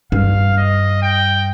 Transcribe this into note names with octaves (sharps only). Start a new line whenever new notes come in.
G2 F5
D#5
G5